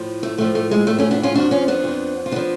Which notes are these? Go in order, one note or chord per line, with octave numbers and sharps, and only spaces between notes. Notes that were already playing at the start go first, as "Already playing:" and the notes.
Already playing: A2 F3
A3
A2 F3 A3
A3
G#3
A2 F3 A3
A3 C#4
B3 D4
C#4 F4
F2 F3 D4 F#4
C#4 F4
B3 D4
F2 F3
F4
F3 B3 D4